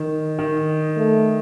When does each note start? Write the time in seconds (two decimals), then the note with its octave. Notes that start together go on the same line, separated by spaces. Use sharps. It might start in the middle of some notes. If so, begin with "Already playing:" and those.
Already playing: D#3
0.39 D#3
0.97 A3